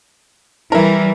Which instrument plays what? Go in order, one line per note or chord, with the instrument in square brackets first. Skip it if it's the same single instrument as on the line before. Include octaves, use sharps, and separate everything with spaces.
[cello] E3 G3 [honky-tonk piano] E4 A#4